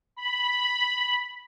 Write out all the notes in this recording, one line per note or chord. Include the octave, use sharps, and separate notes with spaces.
B5